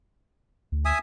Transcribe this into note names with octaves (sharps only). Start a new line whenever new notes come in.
D2
E5 G#5 D#6